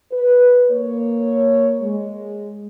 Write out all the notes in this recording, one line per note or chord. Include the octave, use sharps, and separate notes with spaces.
B4
A#3 C#5
G#3